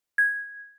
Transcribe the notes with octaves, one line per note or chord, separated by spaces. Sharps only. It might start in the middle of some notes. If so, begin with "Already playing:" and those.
G#6